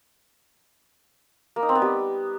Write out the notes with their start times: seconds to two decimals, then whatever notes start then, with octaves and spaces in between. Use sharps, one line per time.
1.56 A#3
1.63 D#4
1.69 C4
1.75 B3
1.82 G3